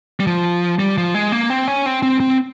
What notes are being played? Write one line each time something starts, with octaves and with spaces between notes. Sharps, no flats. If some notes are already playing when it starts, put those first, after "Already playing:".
G3
F3
G3
F3
G#3
A#3
C4
C#4
C4
C4
C4